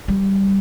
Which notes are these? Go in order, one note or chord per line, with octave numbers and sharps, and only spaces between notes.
G3